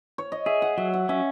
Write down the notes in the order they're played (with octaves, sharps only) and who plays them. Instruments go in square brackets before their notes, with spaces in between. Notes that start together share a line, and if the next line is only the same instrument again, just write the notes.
[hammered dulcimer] C#5
D#5
[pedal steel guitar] G#4 [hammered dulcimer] E5
[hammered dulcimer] F#5
[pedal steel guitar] F#3 [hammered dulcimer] E5
[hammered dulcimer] F#5
[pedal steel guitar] C#4 [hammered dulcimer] E5